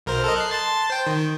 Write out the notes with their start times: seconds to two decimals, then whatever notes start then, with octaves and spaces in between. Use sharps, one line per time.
0.06 B1 A#4 C5
0.24 A4 A#4 D#5
0.36 F#6 C7
0.51 A5 C6 A6
0.90 C5 G5
1.07 D#3